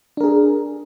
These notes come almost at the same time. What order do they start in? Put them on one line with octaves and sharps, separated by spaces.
D4 A#4 G#4